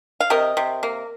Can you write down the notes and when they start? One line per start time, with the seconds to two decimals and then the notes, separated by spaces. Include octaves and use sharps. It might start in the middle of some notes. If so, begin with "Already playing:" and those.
0.20 F5
0.30 C3 A#4 D#5
0.57 C3
0.83 A#3